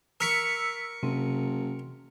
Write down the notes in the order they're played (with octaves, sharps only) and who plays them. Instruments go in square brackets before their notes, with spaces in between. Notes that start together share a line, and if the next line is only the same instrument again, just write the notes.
[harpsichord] A#4 C#6 [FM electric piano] E6 B6 C#7
[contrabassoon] F#1 [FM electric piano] C3